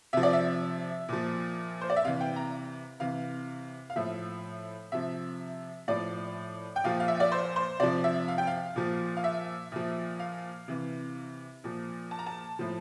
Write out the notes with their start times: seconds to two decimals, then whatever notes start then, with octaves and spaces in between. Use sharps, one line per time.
0.13 C3 F3 E5
0.23 D5
0.33 E5
1.09 A#2 F3
1.81 C5
1.90 D5
1.96 E5
2.05 C3 E3 F5
2.20 G5
2.36 A#5
3.00 C3 E3 F5
3.90 F5
3.96 A2 F3 E5
4.92 C3 F3 E5
5.88 A2 F3 D5
6.76 G5
6.84 A#2 F3 F5
7.00 F5
7.08 E5
7.20 D5
7.32 C5
7.56 C5
7.80 C3 F3 D5
8.04 E5
8.28 F5
8.38 G5
8.47 F5
8.76 A#2 F3
9.17 F5
9.24 E5
9.72 A#2 F3
10.19 F5
10.68 C3 E3
11.64 A#2 F3
12.11 A5
12.19 A#5
12.26 A5
12.59 A2 F3